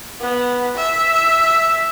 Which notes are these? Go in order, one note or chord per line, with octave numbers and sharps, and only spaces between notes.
B3
E5